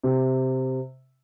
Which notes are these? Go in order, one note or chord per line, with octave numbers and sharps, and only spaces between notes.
C3